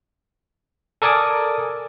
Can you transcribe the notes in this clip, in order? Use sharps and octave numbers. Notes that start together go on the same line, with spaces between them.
A4 A#4 D5 G#5 D6 D#6